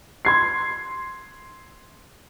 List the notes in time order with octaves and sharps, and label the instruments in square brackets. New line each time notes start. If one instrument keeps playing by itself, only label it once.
[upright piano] C6 G#6 C7